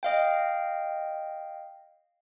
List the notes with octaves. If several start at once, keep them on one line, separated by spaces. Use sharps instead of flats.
D#5 F5 G5